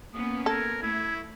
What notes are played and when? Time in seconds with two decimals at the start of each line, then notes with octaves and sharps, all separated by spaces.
0.14 A#3 B3 C#4 D#6
0.46 A4 A#4 G#6
0.82 A3 E4 G#6